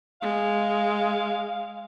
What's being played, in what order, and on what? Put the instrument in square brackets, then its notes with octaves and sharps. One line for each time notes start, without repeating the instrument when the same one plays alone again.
[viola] G#3 [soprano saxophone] F5